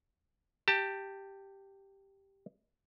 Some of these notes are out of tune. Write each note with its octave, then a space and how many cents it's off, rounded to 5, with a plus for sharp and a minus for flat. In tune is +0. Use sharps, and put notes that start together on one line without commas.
G4 +0 A5 +25